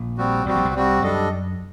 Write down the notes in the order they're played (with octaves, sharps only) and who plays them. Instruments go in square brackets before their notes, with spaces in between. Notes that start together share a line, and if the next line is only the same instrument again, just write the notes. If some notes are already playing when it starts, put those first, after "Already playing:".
Already playing: [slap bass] A#1 A#2
[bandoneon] G3 C4 F#4
[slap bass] A1 A2 [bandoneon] G3 C4 F#4
[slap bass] A#1 A#2
C2 C3
[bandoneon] G3 C4 F#4
[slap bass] F#2 F#3 [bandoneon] G3 D4 A4 D#5